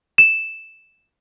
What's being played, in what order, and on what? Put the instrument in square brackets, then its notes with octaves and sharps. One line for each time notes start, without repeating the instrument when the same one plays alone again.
[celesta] E7